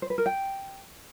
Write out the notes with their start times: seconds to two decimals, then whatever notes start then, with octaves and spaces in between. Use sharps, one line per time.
0.02 C5
0.10 B4
0.18 A#4
0.26 G5